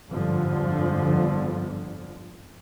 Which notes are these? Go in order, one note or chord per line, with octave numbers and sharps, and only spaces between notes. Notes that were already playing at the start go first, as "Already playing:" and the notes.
G1 F2 G#2 D3 F3